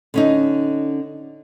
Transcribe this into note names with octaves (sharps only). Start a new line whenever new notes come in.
D3 C#4 D#4